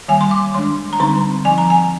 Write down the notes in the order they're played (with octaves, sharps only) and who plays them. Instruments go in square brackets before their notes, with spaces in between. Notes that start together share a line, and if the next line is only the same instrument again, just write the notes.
[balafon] D#3 G3 A#3 G#5
C6
D6
D#3 G#3 D4 C6
A#5
D3 G3 C4 D#4 C6
F3 C4 D#4 G#5
A#5
G#5